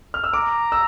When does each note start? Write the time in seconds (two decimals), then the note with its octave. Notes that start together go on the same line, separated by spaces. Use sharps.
0.14 F6
0.24 E6
0.33 A#5 D6
0.72 E6